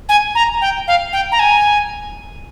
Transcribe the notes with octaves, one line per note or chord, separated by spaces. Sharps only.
G#5
A#5
G5
F5
G5
A#5
G#5